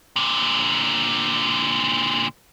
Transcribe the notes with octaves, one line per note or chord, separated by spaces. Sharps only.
A#2 D3